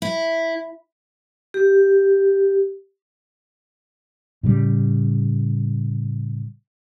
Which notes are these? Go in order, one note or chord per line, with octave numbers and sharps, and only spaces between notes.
E4
G4
A2 C#3 G3